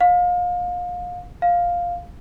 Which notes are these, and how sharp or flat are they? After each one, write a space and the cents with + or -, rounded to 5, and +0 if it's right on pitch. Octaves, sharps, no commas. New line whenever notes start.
F5 +30
F5 +5